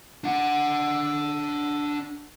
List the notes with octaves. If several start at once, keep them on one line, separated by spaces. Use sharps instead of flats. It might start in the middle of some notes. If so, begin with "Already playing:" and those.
D4 F#5